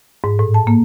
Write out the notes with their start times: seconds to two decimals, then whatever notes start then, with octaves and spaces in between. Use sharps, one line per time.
0.24 G#2
0.39 A2
0.54 A5
0.67 A#3